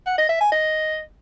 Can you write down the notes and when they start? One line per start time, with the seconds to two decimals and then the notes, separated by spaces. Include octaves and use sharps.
0.07 F#5
0.18 D#5
0.29 E5
0.40 G#5
0.52 D#5